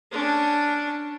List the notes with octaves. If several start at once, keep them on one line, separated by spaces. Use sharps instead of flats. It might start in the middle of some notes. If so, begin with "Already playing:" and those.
C#4 D4